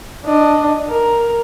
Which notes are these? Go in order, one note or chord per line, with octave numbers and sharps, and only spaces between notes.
D4 D#5
A#4